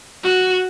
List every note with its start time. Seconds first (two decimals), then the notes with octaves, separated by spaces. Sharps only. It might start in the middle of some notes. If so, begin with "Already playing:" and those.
0.24 F#4